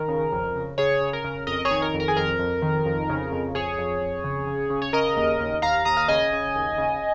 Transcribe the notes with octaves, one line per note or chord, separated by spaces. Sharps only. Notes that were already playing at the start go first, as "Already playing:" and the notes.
Already playing: D#3 A#4
C#3
F2
C#3
C#3 G#4 C#5
C#3
A#4
C#3
F2 A#4 D#5
G#4 C#5
D#3
A#4
F2
A#4
G#4
F2 A#4
F2
D#3
F2
C#3
F2
F2 G#4 C#5
F2
F2
C#3
C#3
C#3
C#5
C#3 A#4 D#5
D#2
D#2
D#2 F5 A#5
D#2 A#5 D#6
F5
C#3 D#5 G#5
C#3
D#2
C#3